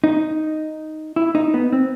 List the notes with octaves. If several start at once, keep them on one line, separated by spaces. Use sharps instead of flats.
D#4
E4
D#4
B3
C4